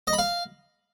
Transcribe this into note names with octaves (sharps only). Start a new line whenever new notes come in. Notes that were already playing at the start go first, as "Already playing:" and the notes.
D#5
B5
F5